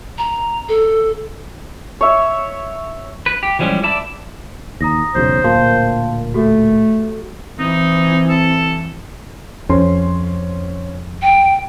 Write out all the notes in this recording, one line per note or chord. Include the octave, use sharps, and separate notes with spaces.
A#5
A4
C#5 E5
B4
G4
E3 F3 G3 G#3 C#4
D5 E5 A5 B5
D#2 A#5 D#6 A#6
E1 B1 C#3 C5
D1 A#2 A#3 F5 A5 C6
A3 F#4 G4 A4
E3 C4 D#4
A4
F2 C#4 C5 C6
G5